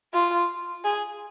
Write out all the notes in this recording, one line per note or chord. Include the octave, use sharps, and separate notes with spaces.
F4
G#4